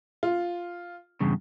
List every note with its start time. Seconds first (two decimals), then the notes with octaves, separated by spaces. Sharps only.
0.23 F4
1.21 E2 G2 C#3